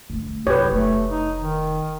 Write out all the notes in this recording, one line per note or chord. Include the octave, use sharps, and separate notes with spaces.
D3 A3
F#2 C3 G4 B4 C#5
F1 A3
D#4
D#3